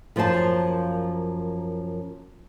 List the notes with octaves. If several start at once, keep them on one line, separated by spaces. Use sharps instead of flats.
F#2 F3 A#3 C5 A5